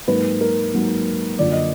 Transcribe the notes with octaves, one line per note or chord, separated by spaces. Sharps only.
G#2 F#3 A#3 B4
A#4
G#2 F#3 A#3
F#2 D3 F3 A#3 D5
D#5